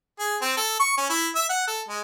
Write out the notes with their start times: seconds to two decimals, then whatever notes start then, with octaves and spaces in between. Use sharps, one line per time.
0.19 G#4
0.42 C4
0.57 A4
0.80 C#6
0.97 C#4
1.10 E4
1.35 E5
1.49 F#5
1.68 A4
1.88 G#3